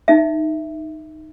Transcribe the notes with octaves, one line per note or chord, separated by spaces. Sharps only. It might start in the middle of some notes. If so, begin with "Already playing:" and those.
D#4 E5